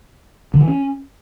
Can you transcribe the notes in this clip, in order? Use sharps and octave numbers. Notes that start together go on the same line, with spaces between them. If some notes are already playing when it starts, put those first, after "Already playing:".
D3
E3
C#4